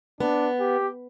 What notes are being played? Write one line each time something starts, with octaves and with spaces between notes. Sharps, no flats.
B3 D4
G4